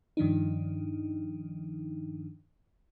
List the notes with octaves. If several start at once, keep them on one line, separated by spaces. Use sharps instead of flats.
G2 D#3 F3 D4 D#4